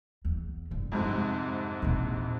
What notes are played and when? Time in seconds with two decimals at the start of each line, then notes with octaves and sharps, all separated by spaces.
0.25 E2
0.71 F#2 D3
0.92 F2 G#2 C3
1.82 A#1 E2